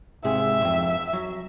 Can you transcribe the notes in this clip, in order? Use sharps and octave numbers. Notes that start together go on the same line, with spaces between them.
G#2 C3 G#4 E5
F2 G#2
F#3